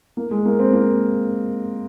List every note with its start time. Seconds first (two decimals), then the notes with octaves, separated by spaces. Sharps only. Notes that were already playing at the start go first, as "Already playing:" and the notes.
0.17 A#3
0.31 G#3
0.45 A#3
0.59 C4
0.73 A#3